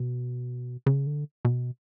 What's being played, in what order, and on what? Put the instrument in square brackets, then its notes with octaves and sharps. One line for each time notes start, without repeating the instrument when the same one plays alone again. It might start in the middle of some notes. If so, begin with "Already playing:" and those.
Already playing: [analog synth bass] B2
C#3
D3
B2